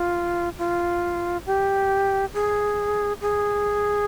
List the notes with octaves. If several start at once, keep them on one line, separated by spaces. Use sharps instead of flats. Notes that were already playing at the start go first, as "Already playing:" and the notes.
Already playing: F4
F4
G4
G#4
G#4